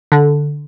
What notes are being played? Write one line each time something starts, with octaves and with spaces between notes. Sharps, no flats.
D3